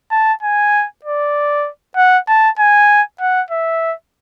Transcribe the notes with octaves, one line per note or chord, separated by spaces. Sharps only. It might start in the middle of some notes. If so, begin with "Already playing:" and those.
A5
G#5
D5
F#5
A5
G#5
F#5
E5